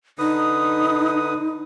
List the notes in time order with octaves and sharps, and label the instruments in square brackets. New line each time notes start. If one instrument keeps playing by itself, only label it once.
[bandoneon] D3 B4 D#6 [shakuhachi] D#4